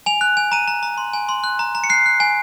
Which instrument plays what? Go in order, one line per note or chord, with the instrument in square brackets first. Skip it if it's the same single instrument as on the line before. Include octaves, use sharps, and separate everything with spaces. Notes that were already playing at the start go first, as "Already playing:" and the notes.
[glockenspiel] G#5 F7
F#6
G#5
A#5 D#7
A#5
A#5
C6
G#5
C6
F#6
A#5
A#5
C#7
F#6 C7
F#6
G#5